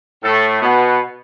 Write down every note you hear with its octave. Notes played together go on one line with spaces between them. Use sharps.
A2 A3 A4
B2 B3